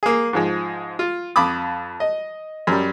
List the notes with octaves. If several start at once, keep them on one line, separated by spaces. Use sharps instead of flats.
A#3 G#4
G#2 F3 G#3
F4
F2 B5 D6 D#6
D#5
F#2 G3